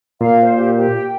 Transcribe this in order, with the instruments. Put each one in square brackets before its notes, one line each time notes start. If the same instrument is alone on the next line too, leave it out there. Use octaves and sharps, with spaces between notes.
[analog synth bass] A#2 [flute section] F5
[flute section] C5
G4
G4
G5